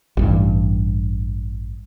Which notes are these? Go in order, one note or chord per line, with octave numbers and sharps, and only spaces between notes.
A1 G2 E3